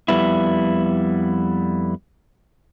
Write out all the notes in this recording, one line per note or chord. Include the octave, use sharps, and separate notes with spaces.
F2 G3 B3 E4